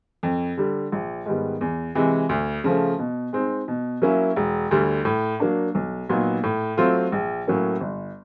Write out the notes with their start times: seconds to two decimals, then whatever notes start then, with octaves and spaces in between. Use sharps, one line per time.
0.23 F2
0.57 D3 G3
0.92 A#1
1.26 G#2 D#3 G3 B3
1.61 E2
1.95 C3 E3 G#3
2.29 D2
2.64 C#3 F3 A3
2.99 B2
3.33 G#3 C4 D#4
3.68 B2
4.02 F#3 A#3 C#4 E4
4.36 E1
4.71 D2 D3 G3
5.05 A2
5.40 F#3 A#3 D4
5.75 B1
6.09 A#2 F#3 B3 D#4
6.43 A2
6.77 F#3 A3 C4 F4
7.12 A#1
7.47 A2 F#3 A#3 C#4
7.81 G1